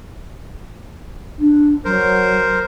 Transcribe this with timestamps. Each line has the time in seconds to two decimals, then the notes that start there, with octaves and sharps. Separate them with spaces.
1.38 D4
1.85 F#3 A#4 C5